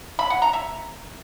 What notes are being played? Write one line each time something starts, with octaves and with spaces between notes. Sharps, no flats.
B5
F#5
A#5
E5